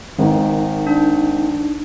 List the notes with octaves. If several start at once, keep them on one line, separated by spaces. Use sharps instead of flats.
G#1 D#3
D#4
D4